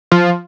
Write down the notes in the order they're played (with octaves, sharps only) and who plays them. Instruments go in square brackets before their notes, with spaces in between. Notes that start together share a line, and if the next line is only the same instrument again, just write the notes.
[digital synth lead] F3